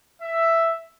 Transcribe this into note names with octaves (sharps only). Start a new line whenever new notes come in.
E5